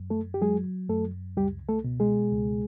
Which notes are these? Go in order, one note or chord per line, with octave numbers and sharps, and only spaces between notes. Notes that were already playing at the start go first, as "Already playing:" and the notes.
Already playing: F#2
A3 A4
G4
F#3 G#3 G#4
F#2 A3 A4
C#2 G3 G4
A3 A4
B2
G#3 G#4
C#2